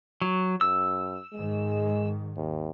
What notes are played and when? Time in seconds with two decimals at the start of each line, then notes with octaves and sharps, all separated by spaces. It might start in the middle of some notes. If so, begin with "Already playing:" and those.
0.21 F#3
0.61 F#2 E6
1.33 G#2 D#3 G#3
2.37 D#2